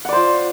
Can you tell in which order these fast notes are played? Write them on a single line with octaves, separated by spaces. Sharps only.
F#5 D5 C5 F4